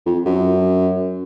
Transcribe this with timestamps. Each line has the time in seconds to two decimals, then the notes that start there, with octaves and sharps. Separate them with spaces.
0.06 F2
0.25 F#2